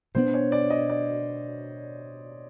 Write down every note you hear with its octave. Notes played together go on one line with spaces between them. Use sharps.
B2 G3 B3 D4 C5
C#5
D5
D#5
D5